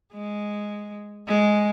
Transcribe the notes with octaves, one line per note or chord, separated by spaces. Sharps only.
G#3
G#3